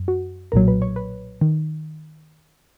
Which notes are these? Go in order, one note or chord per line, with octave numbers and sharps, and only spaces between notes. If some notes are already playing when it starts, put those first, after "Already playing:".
Already playing: F#2
F#4
B1 A#2 F#3 A#4
B4
C#5
B4
D#3